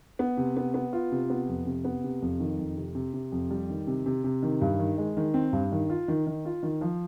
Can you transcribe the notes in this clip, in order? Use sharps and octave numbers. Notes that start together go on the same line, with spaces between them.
B3
C3
B3
B3
F4
C3
B3
F2
C3
B3
C3
F2
D#3
F2
C3
C3
C3
F2
G3
D#3
C3
C3
C3
D#3
G2
D#3
G#3
D#3
C4
G2
D#3
F4
D#3
D#3
F4
D#3
F3